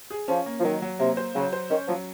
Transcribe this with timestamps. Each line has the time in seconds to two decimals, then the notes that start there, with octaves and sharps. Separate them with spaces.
0.10 G#4
0.28 F3 C#4
0.46 A#3
0.60 F3
0.64 D#3 F#3
0.82 F#3
0.99 C3 A#3
1.17 C5
1.35 C#3 F#3
1.53 C5
1.70 D#3 C#4
1.88 F3 F#3